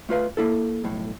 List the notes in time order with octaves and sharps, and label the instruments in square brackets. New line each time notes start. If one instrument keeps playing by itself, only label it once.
[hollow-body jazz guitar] A3 F4 B4 F5
A#3 E4 A4
B1 F2 A2